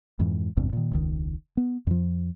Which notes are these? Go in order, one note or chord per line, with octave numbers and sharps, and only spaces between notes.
F2 G#2 E3
G#1 E2 G2 C3
A#2 D#3
E1 C#2 D#3
B3
F2 F3